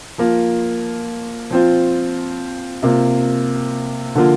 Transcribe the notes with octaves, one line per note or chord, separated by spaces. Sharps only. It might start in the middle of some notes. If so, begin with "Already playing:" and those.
F3 A#3 F4
F3 C4 F4
C3 A#3 F4
D3 F3 A#3 F4